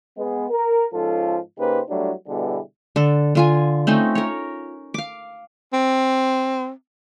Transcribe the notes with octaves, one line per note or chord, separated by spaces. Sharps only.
G#3 B3
A#4
G#2 F3 C#4 F4 A4
C#3 A#3 D#4 G4 B4 C5
F#3 G3 A3 D4 E4
B2 D3 G3 B3 E4 G#4
D3 A4
D3 F4 G#5
A3 C4 C#4 D#4
A#4 C#5
F5 D6
C4